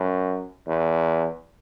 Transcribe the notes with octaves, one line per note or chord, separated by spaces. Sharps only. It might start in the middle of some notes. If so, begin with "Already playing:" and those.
Already playing: F#2
E2